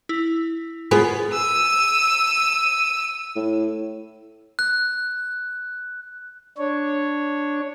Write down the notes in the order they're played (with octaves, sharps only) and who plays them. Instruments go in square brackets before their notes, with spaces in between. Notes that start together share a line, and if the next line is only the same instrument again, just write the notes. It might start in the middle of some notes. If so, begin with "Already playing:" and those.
[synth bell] E4
[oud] B3 [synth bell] F4 B5 [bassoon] G#4
[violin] E6 D#7
[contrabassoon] A2
[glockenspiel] F#6
[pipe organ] D4 C#5